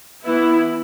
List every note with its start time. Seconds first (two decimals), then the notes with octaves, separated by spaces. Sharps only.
0.23 E3 B3 E4